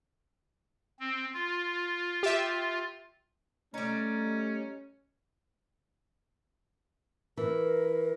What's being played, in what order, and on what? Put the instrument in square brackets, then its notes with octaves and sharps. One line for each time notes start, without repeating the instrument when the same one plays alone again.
[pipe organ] C4
F4
[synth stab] G4 E5
[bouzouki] G3 D#4 [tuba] A3 [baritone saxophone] C#4
[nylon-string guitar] E3 [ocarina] A#4